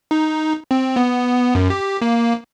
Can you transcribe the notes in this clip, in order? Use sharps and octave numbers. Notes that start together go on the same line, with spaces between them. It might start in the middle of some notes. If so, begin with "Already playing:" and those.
D#4
C4
B3
F#2
G4
A#3